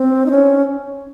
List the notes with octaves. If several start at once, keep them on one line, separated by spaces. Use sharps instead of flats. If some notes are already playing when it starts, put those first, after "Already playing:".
Already playing: C4
D#4
C#4